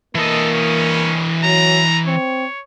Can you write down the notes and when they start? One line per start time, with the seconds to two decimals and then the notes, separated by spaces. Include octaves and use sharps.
0.15 E3 A#3 A4 D#5
0.52 C#4
1.43 F#3 A#5
2.07 C4 C#5